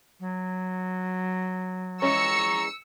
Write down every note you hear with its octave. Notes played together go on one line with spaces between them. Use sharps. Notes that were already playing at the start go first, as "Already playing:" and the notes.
F#3
E3 G#3 C#4 A#5 C#6 E6 C#7